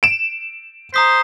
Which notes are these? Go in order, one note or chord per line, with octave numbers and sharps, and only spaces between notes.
D7 E7
C5 A#5 D#6 B6